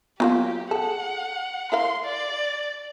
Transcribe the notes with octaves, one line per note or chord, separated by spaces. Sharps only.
F#3 G#3 A#3 B3 F4 G4 F5
G#4 A4 F#5 G5
E4 A#4 F5 C6
D5